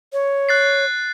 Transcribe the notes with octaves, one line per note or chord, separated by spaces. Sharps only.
C#5
F#6 A6 C7